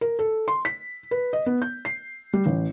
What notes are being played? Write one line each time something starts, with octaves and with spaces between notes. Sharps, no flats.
A#4
A4
C6
B6
B4
D#5
B3
G6
C7
G3
A1